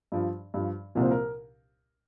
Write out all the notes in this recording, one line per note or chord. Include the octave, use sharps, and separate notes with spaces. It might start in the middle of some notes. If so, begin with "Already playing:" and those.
G2 F3
G2 F3
C2 A#2 F3 A#4
C5
A#4